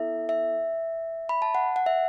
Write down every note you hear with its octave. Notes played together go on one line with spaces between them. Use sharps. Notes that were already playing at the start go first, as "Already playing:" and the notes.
Already playing: B3 E4 A4 E5
E5
B5
A5
F#5
F#5
E5